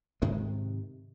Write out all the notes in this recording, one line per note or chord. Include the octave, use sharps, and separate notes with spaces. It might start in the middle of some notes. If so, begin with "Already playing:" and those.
G#2 C3 D#3 G#3